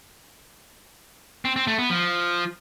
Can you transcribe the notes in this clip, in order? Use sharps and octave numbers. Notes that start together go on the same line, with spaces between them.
C4
C4
A3
B3
F3